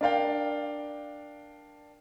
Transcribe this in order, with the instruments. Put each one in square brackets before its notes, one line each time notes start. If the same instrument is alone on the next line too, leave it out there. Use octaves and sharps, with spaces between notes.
[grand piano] D4 A#4 D5 F5 G5